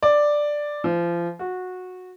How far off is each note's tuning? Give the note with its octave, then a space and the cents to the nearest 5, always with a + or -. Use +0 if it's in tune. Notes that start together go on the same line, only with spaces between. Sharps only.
D5 +5
F3 -30
F#4 -15